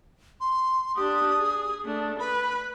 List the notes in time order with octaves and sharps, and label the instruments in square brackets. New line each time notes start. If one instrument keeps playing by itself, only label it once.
[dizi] C6
[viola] D4 G4 [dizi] D#6
[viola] G#4
A3 D4
[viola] B4 [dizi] B5